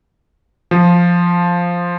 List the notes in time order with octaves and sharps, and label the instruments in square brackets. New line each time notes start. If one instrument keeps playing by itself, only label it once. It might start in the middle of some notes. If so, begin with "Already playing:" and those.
[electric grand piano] F3